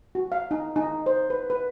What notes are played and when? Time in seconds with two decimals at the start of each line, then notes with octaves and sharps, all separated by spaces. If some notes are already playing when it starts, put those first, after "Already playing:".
0.15 F#4
0.32 F5
0.51 D#4
0.76 D#4
1.06 C5
1.30 B4
1.50 B4